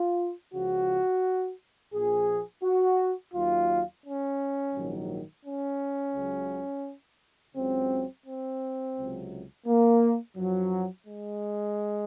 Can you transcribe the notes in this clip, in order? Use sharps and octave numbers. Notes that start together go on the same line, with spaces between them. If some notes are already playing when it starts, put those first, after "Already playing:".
Already playing: F4
C#2 C#3 F3 F#4
A#1 A#2 F3 G#4
F#4
D#2 D#3 F#3 F4
C#4
A#1 G#2 D#3 F#3
C#4
C#2 C#3 F#3
C#2 C#3 F#3 C4
C4
C#2 C3 F#3
A#3
F#2 F3 F#3
G#3